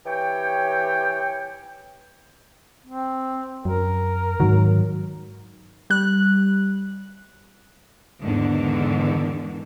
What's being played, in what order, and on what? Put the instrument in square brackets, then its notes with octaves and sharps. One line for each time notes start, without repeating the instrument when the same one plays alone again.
[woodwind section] E3 G4 C#5 G5
[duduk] C4
[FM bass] F#2 [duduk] A#4
[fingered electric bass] G#2 D#3 [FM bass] F#3
[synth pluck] G3 F#6
[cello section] E2 G#2 D3 D#3